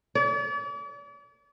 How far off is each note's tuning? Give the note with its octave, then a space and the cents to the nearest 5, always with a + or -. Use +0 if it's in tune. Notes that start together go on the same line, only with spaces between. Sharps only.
D5 -40